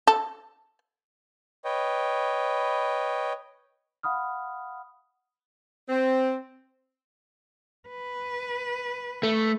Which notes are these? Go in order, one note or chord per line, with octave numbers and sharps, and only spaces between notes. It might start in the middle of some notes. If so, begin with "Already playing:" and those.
A4
B4 C#5 D#5 G5
F5 F#5 B5 D#6 F6
C4
B4
A3